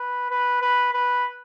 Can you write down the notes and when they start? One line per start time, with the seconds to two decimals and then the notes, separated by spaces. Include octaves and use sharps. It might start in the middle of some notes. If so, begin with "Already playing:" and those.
Already playing: B4
0.30 B4
0.62 B4
0.93 B4